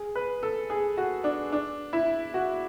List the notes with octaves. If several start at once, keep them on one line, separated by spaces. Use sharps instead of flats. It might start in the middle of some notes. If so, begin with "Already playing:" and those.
Already playing: G#4
B4
A4
G#4
F#4
D4
D4
E4
F#4